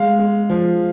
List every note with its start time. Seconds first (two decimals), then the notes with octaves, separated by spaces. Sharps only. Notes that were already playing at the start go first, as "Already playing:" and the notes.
Already playing: G#3 F5
0.19 G#3
0.50 F3